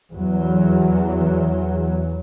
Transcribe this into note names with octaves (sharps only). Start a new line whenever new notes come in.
E2 F#3